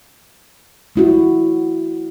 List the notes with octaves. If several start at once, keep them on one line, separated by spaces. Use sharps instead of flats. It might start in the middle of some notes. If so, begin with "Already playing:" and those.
A3 E4 F#4